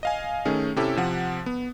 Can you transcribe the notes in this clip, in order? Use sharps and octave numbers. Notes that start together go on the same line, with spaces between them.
D#5 F5 G#5
D#3 A3 C#4 G#4
C3 C#4 E4 G4 A4
C3 F3 F#5
B3